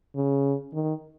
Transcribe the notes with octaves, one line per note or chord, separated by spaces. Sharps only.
C#3
D#3